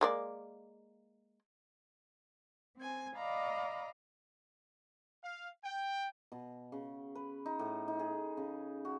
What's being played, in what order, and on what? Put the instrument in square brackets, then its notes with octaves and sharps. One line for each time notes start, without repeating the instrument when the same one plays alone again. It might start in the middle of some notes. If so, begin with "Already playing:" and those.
[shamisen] G#3 A#3 D5
[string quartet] C4 G#5
D5 D#5 F5 A#5 B5
[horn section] F5
G5
[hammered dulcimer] B2
C#3
B4
D#4
A2
D#4
G#4
C#3
F#4